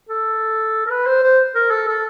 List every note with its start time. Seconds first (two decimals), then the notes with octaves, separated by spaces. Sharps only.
0.09 A4
0.87 A#4
0.90 B4
1.06 C5
1.23 C5
1.55 A#4
1.71 A4
1.88 A4